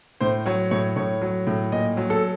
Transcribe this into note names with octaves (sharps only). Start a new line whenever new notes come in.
A2 C5
F#3 C#5
A2 C#5
A2 C#5
F#3
A2
A#2 D#5
F#3
A4